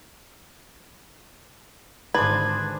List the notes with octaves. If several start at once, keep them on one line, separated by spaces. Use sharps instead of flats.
G#1 D3 D4 G#4 B4 C5 G#6